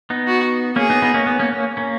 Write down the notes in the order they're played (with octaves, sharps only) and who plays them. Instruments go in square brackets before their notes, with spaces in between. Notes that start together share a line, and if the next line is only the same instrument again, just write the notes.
[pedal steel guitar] B3 D#4
[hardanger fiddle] F#4
[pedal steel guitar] A#3 C#4 [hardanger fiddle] G#4
[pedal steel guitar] B3 D#4
B3 D#4
A#3 C#4
B3
A#3 C#4
A#3 C#4
A#3 C#4